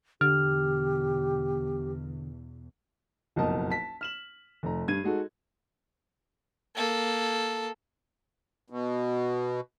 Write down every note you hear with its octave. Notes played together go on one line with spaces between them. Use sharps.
E2 B2 D3 G4 F6
F#1 B1 F2 A#4 D#5 A5
A5 B6
F6 E7 F#7
F1 A#5
G2 G#6 D#7
G#3 D#4 F#4 A4
A#3 A4
B2